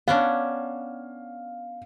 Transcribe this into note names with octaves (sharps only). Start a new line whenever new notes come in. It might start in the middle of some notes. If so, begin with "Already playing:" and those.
B3 C#4 D4 F5